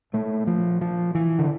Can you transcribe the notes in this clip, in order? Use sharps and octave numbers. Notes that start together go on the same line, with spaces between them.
A#2 A3
F3
F3
E3
D3